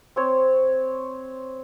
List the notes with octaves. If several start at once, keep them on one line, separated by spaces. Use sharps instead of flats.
C4 C#5